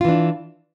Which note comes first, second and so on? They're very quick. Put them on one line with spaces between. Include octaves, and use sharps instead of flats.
F4 E3 D4